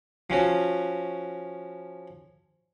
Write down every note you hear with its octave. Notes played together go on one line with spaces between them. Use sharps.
F3 C#4 F#4